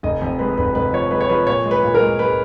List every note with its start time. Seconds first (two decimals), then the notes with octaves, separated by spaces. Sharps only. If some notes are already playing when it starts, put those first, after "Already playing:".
0.03 F1 D#5
0.22 F2
0.39 G#3 B4
0.58 F1 B4
0.75 F1 B4
0.93 F3 C#5
1.11 G#3 B4
1.21 C#5
1.29 F3 B4
1.47 A#2 C#5
1.66 G#3
1.71 B4
1.83 A#2
1.95 A#4
2.01 G#3
2.19 G#3 B4